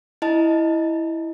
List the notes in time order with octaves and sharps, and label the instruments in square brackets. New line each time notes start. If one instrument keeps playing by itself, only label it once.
[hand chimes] E4 D#5 A5